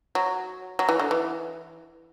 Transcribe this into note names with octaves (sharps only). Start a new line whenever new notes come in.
F#3
F#3
E3
D3
E3